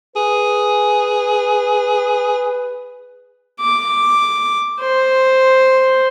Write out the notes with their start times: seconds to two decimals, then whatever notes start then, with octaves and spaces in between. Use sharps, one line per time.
0.16 G#4 B4
3.61 D6
4.80 C5